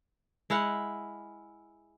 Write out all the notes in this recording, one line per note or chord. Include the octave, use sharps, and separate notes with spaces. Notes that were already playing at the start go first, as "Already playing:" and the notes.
G#3 E4 F5 F#5